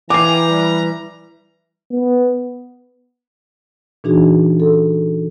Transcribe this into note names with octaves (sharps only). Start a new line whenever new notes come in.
E3 F5 G5 G#5 A#5 D6 C7
G3 B4
B3
A#2 E3 D4 D#4 F#4 G#4
A4